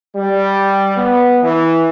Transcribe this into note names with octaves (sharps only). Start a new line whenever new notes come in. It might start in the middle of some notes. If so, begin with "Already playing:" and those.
G3
B3
E3